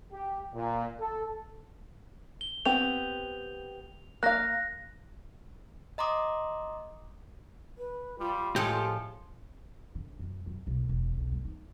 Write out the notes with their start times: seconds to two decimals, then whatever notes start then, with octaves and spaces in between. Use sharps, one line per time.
0.13 G4
0.54 A#2
1.00 A4
2.41 G7
2.65 B3 C4 G4 F7
4.23 A#3 F5 F#6 A#6
5.98 D#5 A#5 C6 D6 D#6
7.78 B4
8.19 G3 F4
8.56 A2 F3 G#3 G4 A4
9.95 D3
10.19 F#2
10.46 F#2
10.67 B1
10.89 E1
11.17 B1
11.32 G3
11.45 D#4